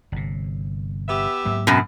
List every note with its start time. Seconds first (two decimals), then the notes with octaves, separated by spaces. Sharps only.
0.12 G1 C3
1.08 B3 G4 E5
1.45 G#2 F#3 A#3
1.67 F#2 B2